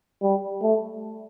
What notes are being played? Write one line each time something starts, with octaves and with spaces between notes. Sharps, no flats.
G3
A3